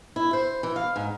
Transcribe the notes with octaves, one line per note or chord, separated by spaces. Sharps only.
E4
C5
E3
F5
G#2